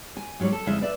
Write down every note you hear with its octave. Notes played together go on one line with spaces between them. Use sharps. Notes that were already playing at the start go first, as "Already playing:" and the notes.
G#5
G#2 F#3 G3 C#5
A4
F2 C#3 G#3 E4 E5
B4 D5 E5